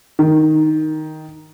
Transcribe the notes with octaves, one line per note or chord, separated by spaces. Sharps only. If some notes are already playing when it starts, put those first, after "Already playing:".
D#3